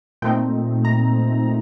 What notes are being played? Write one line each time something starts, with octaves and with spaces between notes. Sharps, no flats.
A#2 A3 C4 D#4 G5
A#5